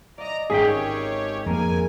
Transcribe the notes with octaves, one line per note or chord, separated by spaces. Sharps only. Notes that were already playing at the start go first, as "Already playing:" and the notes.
D5 D#5 A#5
G#1 C#4 G4 G#4 C#5 G5 B6
F2 A#3 G#4 A#4 G#5